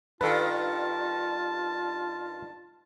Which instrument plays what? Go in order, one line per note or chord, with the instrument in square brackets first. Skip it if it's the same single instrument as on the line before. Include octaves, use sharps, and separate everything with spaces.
[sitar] G2 D#3 [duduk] F4 [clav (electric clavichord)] A4 B4 [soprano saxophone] A5